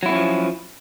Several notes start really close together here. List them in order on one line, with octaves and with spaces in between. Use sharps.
F#3 E4 B3 C#4 F3